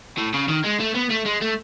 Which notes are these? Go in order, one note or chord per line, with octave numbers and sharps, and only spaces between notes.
A2
C#3
D#3
G#3
A3
B3
A3
G#3
A3